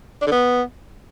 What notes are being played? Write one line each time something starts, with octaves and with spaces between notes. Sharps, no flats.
D4
D3
B3